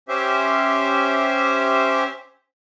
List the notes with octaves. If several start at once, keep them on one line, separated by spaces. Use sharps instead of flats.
C#4 G4 C5 E5